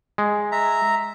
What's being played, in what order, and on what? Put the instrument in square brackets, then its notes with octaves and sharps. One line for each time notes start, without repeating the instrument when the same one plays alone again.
[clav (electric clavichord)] G#3
[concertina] E5 A#5